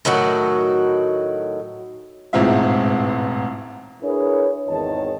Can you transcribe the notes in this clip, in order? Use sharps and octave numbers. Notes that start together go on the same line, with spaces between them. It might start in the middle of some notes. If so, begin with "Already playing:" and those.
A2 D#3 F#3 F#4
E1 A1 G#2 C4 F4 E5
D4 E4 G#4 A#4 B4 C#5
G#1 E2 D#3 C#5 D#5 A5